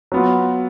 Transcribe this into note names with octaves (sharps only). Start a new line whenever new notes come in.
F#3 B3 F4